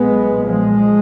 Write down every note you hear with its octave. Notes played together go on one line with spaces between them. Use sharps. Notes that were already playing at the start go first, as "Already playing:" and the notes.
Already playing: B1 A#2 G#3 B3
F3 G#3